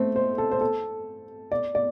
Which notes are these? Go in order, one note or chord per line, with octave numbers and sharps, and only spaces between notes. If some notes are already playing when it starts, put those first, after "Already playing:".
Already playing: A3 C4
C5
A4
C5
A4
D5
D5